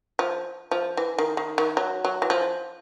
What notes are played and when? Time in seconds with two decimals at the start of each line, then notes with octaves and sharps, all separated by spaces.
0.19 F3
0.71 F3
0.97 E3
1.19 D#3
1.37 D#3
1.58 D#3
1.77 F#3
2.05 F#3
2.22 E3
2.30 F3